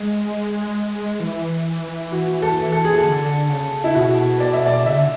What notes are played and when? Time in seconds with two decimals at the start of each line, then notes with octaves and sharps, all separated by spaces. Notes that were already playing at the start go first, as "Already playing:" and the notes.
Already playing: G#3
1.20 E3
2.12 F#4
2.42 A4
2.72 A4
2.85 G#4
2.98 D3 A4
3.49 C#3
3.84 E4
3.94 B2 F#4
4.40 D5
4.53 E5
4.66 D5
4.86 C#3 E5
4.95 D3